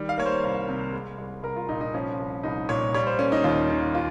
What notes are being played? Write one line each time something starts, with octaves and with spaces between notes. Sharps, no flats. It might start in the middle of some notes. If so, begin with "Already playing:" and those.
Already playing: D#3 G3
F5
A#3 C#5
C5
C2
C3
G#3
C2
C2 A#4
F4
A#2 D#4
D#4
F3 C#4
C2
C2 D#4
A#2 C#5
G3 C#5
C5
A#3 C#4
D#4
D#2 F4
D#3
F4